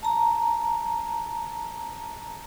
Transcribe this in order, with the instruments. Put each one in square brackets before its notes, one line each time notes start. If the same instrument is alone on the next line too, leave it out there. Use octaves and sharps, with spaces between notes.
[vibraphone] A5 A#5